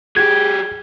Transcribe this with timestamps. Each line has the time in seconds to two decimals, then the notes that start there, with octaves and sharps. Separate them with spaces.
0.17 F#3 G4 G#4 G#6